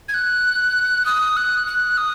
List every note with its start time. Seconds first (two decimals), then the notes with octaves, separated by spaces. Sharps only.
0.08 G#6
0.14 F#6
1.06 D#6
1.37 F#6
1.67 F#6
1.97 D#6